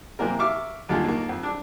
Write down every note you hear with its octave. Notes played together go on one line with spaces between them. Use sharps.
C3 E3 A#3 C4 A#4
E5 F5 C#6 D6 F6
D#2 D3 F4 G#4
D#2 A#3
F2
D4